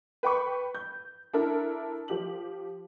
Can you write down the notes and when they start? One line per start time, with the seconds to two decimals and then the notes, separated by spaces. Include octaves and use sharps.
0.23 B4 G5 B5 C#6
0.75 G6
1.33 D4 E4 A4 A#4
2.08 F3 G4 F#7